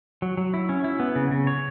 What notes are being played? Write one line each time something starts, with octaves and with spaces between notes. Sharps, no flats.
F#3
F#3
E4
C#4
E4
B3
C#3
C#3
C#5